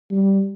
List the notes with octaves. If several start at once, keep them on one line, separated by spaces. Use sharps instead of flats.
G3